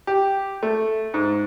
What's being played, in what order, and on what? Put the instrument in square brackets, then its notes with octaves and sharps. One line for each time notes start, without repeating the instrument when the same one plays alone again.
[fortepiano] G4
A3
G#2